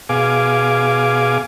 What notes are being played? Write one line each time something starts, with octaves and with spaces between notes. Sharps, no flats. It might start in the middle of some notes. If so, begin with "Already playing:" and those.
B2 G#4 F5 G#5 D6